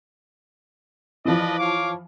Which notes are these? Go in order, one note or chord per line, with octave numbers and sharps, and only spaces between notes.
E3 F3 B4 D5 D#5
C#5 F5 D6